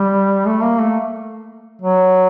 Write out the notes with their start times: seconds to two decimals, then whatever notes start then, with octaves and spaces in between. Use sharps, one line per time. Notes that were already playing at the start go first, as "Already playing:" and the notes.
Already playing: G3
0.46 A3
0.63 A#3
0.80 A3
1.82 F#3